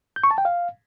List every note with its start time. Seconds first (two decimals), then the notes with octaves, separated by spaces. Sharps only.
0.16 G6
0.23 C#6
0.31 A5
0.38 G5
0.45 F5